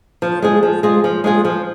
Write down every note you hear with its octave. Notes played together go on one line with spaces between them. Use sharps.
F3
G#3 F4 G#4
F3
G#3 F4 G#4
F3
G#3 F4 G#4
F3